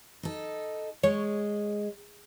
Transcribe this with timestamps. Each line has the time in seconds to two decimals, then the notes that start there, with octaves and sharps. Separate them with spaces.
0.23 D#4 A4
1.03 G#3 C#5